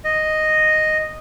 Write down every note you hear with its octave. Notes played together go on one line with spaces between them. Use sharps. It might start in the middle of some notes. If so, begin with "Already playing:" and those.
D#5